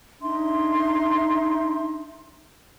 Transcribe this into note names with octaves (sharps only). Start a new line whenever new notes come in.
D4 D#4 E5 C6